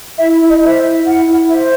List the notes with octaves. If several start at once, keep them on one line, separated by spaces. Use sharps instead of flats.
E4 E5
E4
D#5
C5 E5
E4
E4 F#5
E4
C5 E5